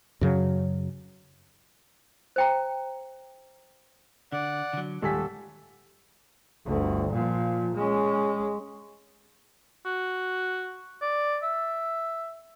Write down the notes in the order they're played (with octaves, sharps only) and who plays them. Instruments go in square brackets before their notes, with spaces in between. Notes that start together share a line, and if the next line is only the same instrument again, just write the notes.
[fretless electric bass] F#2 C#3 F#3
[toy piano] C5 G5 A#5
[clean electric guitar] D3 [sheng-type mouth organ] D5 F#5
[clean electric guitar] D3 F#3
[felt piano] D#1 G#5 B6 [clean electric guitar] G#2 [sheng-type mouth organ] A4
[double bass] G1 D2
A#2 F3
G#3 C#4
[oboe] F#4
D5
E5